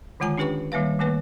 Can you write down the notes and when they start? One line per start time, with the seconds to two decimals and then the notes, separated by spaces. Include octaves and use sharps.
0.20 D3 D#3 G#3 F4 G#5 A#5
0.38 C#4 D4 G4 B4 G5 C#6
0.72 D#3 G3 A#3 B4 F5
0.99 D#3 A3 A#3 B4